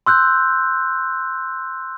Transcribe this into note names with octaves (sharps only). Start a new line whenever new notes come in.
C6 E6 F#6 G6